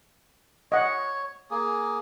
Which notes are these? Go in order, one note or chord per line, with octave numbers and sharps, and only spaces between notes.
C#5 D#5 F#5
A#3 G#4